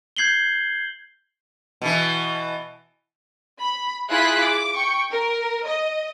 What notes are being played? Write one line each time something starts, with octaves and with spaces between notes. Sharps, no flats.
G6 G#6 C7 F#7 G7
B2 E3
B5
E4 F4 G#4 B5 F#6 B6
D6
G5 C#6
A#4
D#5